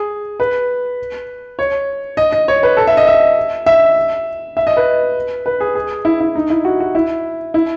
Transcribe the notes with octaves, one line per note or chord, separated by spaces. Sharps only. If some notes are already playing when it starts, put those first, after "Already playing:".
Already playing: G#4
B4
C#5
D#5
D#5
C#5
B4
A4
E5
D#5
E5
E5
E5
D#5
B4
B4
G#4
G#4
E4
E4
D#4
E4
F#4
F#4
E4
E4